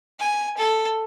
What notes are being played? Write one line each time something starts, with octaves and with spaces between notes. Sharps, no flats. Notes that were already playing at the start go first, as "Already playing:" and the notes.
G#5
A4